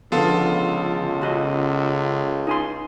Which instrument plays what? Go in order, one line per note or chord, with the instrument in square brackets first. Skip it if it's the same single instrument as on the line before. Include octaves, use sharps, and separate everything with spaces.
[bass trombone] C#2 [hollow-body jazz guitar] D3 F3 [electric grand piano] B3 F4 A4
[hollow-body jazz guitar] C#3 F#4 D#5
D#4 G#5 C6